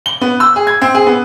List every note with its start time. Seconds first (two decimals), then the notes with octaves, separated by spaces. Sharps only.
0.06 G7
0.21 B3
0.40 E6
0.56 G#4
0.67 G#6
0.82 C4
0.95 G#4
1.06 B3